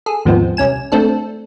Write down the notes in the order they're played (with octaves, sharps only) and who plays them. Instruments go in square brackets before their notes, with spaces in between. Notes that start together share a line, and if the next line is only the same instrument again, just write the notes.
[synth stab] G#4 A4
D#2 G#2 F3 B3 C4
C2 C#4 G#5 E7
A3 C4 D4 A4